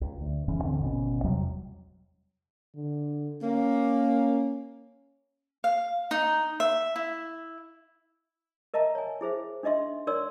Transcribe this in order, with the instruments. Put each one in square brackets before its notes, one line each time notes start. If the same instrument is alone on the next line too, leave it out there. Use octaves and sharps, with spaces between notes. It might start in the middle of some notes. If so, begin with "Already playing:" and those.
[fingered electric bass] C#2
D2
D#1 G#2 E3 C#4
D#2 D3 C4
G#1 B2 C#4
E2 C3 F#3 G3
[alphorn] D3
[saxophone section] A#3 [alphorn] C#4
[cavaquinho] F5
D#4
E5
E4
[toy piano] A#4 D#5 E5 A5 A#5
C#5 G#5
E4 G#4 C5 E5
D4 D#4 D#5 E5 C6
D#4 A#4 C#5 D5 C6 E6